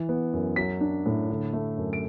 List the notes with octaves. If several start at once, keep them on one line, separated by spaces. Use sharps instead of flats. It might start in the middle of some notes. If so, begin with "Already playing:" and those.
Already playing: E3
B3
F#2
F#3 B6
D4
A2
D3
A3
F#2
D7